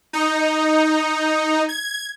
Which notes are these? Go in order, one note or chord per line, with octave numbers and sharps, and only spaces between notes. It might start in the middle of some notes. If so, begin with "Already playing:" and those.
D#4
G#6